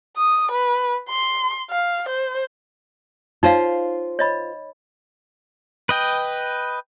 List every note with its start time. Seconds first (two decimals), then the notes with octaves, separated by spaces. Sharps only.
0.17 D#6
0.52 B4
1.10 C6
1.71 F5
2.09 C5
3.43 D#4 F4 C5 C#5 F5
4.19 C#5 D#5 B5
5.89 B4 D#5 G5